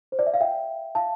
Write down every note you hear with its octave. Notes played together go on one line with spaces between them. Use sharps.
C5
D5
E5
F5
E5 G5
F5 A5